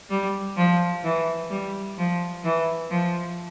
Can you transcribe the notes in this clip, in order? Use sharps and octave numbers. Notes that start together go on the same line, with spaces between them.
G3
F3
E3
G3
F3
E3
F3